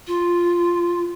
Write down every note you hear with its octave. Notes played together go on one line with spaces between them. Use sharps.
F4